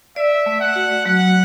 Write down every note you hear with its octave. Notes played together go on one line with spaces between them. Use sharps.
D5 E5
A3
F#5
F#4
F#3 F#5